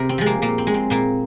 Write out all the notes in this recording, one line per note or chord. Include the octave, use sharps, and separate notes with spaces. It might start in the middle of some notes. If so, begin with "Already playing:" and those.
Already playing: C3 A#4 C5
C4
F3 G#3
A#3
A#2 A#3
C4
G#3
C4
A#2 A#3